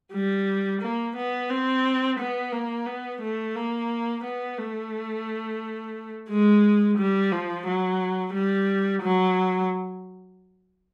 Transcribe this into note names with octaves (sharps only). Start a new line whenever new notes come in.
G3
A#3
B3
C4
B3
A#3
B3
A3
A#3
B3
A3
G#3
G3
F3
F#3
G3
F#3